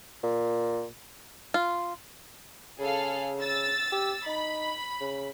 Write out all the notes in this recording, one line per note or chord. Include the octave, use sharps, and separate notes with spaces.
A#2
F4
C#3 G#4 A4 F5
E6 A6
G4
D#4 B5
C#3